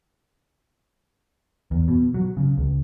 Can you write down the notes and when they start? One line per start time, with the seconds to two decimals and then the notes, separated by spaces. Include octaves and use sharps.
1.71 E2
1.88 B2
2.14 F#3
2.37 C#3
2.58 C#2